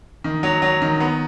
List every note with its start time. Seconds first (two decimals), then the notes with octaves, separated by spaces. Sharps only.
0.24 D#3
0.43 F#3
0.62 F#3
0.82 D#3
1.00 B3